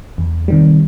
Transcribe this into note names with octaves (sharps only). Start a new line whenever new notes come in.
E2
C3 D#3 G3